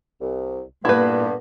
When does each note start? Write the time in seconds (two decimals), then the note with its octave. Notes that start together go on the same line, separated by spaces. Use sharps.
0.21 C2
0.85 G2 A#2 D3 G3 A#3 B3 E4 B4